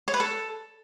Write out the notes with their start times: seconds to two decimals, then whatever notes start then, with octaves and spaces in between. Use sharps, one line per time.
0.08 C#5
0.14 B4
0.20 A4